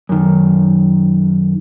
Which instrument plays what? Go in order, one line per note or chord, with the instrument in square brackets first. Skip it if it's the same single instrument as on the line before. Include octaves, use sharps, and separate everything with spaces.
[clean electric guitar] F#2 D#3